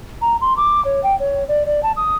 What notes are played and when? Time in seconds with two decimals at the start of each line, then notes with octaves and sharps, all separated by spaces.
0.21 A#5
0.41 C6
0.57 D6
0.85 C#5
1.03 G5
1.19 C#5
1.48 D5
1.66 D5
1.83 A5
1.96 D#6